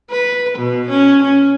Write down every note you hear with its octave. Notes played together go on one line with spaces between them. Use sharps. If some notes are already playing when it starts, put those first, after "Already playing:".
B4
B2
C#4
C#4